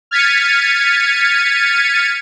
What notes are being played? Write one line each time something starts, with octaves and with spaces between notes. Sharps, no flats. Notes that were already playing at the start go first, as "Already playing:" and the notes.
F6 G#6 A6 B6 C#7 D#7